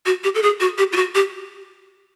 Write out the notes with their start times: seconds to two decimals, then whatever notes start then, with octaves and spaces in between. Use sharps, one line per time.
0.06 F#4
0.24 G4
0.35 A4
0.43 G#4
0.60 F#4
0.78 G4
0.92 F4
0.96 F#4
1.15 G4